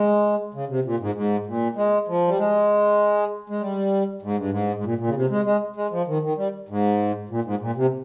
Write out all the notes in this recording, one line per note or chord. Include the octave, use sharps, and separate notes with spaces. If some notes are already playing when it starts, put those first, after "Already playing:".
Already playing: G#3
C#3
C3
A#2
G#2
G#2
A#2
G#3
F3
G3
G#3
G#3
G3
G#2
G2
G#2
G#2
A#2
A#2
C#3
C3
G#3
G#3
G#3
F3
D#3
D#3
G3
G#2
A#2
G#2
A#2
C3